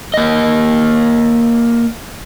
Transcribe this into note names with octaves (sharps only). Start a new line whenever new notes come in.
A#3 D#5